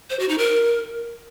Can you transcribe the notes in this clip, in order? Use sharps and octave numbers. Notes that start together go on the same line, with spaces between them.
C5
F#4
D#4
A#4